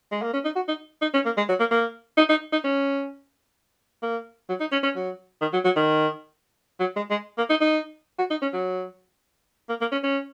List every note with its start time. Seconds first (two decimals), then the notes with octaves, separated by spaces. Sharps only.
0.12 G#3
0.22 A#3
0.34 C#4
0.45 D#4
0.56 F#4
0.68 D#4
1.02 D#4
1.14 C#4
1.26 A#3
1.38 G#3
1.49 F#3
1.60 A#3
1.71 A#3
2.18 D#4
2.30 D#4
2.52 D#4
2.65 C#4
4.03 A#3
4.49 F#3
4.60 D#4
4.72 C#4
4.84 C#4
4.96 F#3
5.41 D#3
5.53 F#3
5.65 F#3
5.76 D#3
6.80 F#3
6.96 G#3
7.11 G#3
7.38 A#3
7.50 D#4
7.61 D#4
8.19 F#4
8.31 D#4
8.42 C#4
8.54 F#3
9.69 A#3
9.81 A#3
9.92 C#4
10.04 C#4